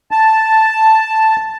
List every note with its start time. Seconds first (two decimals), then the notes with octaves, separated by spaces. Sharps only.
0.11 A5